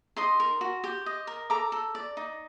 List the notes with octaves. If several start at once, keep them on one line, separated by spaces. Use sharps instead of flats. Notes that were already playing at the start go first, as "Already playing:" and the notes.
D#4 C6 D#6
A#4
F#4
G4
D#5
A#4
A4 A#5 D6
A4
D5
D#4